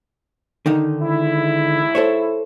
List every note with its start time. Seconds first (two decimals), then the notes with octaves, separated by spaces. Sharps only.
0.66 D3 D#3 D#4
1.01 G#2 E4
1.95 A4 C5 C#5